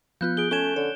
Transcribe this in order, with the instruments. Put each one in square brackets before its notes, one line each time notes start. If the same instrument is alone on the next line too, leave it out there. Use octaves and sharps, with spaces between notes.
[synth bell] F3 B3 F4 [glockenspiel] F#6 G6
[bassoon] G#4 [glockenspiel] D7 G7
[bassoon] A3 [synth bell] C#4 G#5 G#6 [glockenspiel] E7 G7
[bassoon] D3 [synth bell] C#5